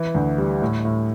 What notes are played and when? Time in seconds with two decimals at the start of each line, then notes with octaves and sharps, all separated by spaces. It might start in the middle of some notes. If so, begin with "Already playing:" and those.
Already playing: E3
0.15 D2
0.38 G3
0.62 A2
0.85 A2